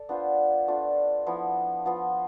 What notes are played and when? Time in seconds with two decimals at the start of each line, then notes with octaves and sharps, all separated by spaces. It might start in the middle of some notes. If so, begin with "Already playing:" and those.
Already playing: A4 D5
0.09 B3 D4 F4 C5
0.68 A3 D4 F4
1.27 F3 B3 E4
1.86 F3 B3 F4